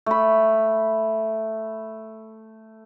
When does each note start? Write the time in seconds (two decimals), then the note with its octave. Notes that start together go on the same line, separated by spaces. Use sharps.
0.06 A3 B5